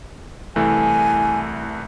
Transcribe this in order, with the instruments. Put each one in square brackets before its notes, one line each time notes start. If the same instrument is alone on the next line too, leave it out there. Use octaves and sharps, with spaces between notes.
[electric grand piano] C2 E3 A3 [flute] G#5